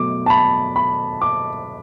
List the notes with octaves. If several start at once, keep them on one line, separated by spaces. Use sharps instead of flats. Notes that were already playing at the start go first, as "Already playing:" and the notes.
Already playing: B2 F#3 A3 D6
A5
B5
B5
D6